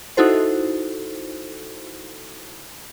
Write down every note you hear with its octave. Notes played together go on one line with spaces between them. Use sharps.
D#4 E4 F#4 A4 C5